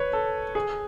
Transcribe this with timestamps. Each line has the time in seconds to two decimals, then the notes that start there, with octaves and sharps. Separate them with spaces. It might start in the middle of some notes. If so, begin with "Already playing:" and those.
Already playing: B4 C#5
0.13 A4
0.55 G#4